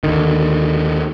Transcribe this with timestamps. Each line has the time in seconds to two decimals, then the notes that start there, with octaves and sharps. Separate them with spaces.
0.04 D#2 D3 D#3